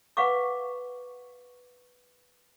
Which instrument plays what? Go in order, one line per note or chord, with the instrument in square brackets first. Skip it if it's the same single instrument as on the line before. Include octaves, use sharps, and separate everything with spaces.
[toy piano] B4 F5 F#5 C#6 D6